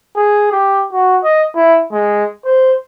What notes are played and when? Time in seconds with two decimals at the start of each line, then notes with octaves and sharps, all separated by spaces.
0.16 G#4
0.52 G4
0.92 F#4
1.24 D#5
1.55 E4
1.92 G#3
2.45 C5